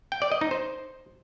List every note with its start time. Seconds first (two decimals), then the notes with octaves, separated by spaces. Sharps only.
0.12 G5
0.22 D5
0.32 D#5
0.41 D#4
0.51 C5